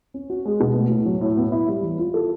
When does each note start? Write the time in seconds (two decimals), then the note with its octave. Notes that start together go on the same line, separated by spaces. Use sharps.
0.14 C#4
0.30 F#4
0.45 G#3
0.60 B2
0.76 A3
0.90 A2
1.06 F#3
1.21 A2
1.37 B3
1.52 E4
1.68 G3
1.83 E3
1.98 F4
2.14 A4